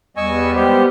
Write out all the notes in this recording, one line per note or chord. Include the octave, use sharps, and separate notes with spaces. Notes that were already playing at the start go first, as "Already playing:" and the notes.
E2 G3 B3 D#5 G#5 C#6 E6
G#3 G4 C5